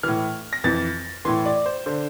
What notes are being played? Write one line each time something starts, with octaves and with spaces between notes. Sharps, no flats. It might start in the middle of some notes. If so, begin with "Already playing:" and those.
A2 E3 F6
A#6
F2 E3 A6
A2 E3 C6
D5
C5
D3 C5